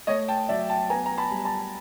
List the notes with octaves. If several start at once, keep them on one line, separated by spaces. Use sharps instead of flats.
A3 C#5 D#5
G5 A5
F#3 D5 E5
G5 A5
B3 G#5 A#5
A#5
A5 B5
G3
A5 B5